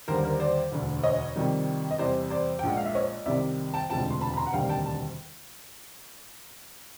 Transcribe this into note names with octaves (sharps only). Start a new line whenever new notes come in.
D#2 D3 G3 A#4 C5
A#4 C5
C5 D5
E1 D2 D3
C#5 D#5
F2 C3 D#3 G3
D#5
E2 C3 E3 G3 C5 D5
C5 D5
G5
A#1 A#2 F3 G#3 F#5
F5
E5
C#5 D#5
C2 C3 D#3 G3 D5 E5
G5 A5
E1 D2 C3 F3 G#3 G5 A5
C6
A5 B5
B5
A#5 C6
F#5
E1 D2 C3 D#3 G3 F5 G5
G5 A5
A5